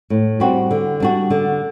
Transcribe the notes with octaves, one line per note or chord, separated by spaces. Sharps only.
A2
G3 C4 F#4
D3
G3 D4 F#4
D3